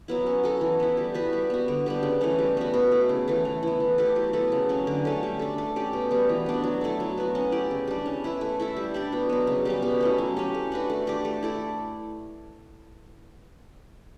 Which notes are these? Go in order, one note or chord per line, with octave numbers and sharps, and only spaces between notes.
F#3 B3 E4
C#4
F#4 A4
E3
B3 E4
G3
B3 F#4 B4
G3
B3 F#4
D3
G3 B3 D4
C#3
E3 A3 C#4
G3
B3 F#4
B2
A3 E4
C#3
E3 A3
E3
B3 E4
E3
A3 E4 G4
F#3
B3 E4 A4
C#3
F#3 C#4
D3
A3 C#4
G3
D4 A4
A3
C#4 G4 D5
B2
G3 B3
E3
B3 D4 F#4
F#3
A3 E4 A4
F#3
B3 F#4
C#4
E4 G4 D5
C#3
G3 D4
C#4
E4 B4 E5
A3
E4 A4 E5
G3
D4 G4 D5
B2
F#3 B3
C#3
G3 C#4 G4
B2
A3 C#4 E4
F#3
C#4 G4
A3
D4 F#4 B4
A3
D4 G4 D5
A3
E4 A4 D5